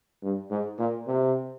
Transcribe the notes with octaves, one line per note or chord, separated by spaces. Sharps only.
G2
G#2
A#2
C3